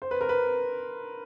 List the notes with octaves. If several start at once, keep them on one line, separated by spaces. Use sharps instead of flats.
C5
B4
A#4
B4